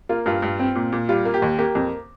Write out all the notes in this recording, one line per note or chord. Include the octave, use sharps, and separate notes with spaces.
A#3 F4
G2 F4
G2
C4
A#2
A#2
G3 F4
A#3
G4
D#2
A#3 G4
F2